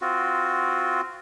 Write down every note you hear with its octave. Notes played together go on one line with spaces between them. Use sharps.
C4 F4 F#4